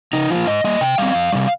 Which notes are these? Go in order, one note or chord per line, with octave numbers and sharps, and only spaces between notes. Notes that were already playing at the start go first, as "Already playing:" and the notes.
C#3 D#4
F3 A#3 F4
G#2 D#5
G3 A#3 D#5
C3 G5
G3 C4 F5
F2
C3 G3